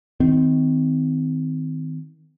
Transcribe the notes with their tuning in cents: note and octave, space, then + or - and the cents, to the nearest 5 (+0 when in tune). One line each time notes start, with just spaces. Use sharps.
D#3 +20 C4 -30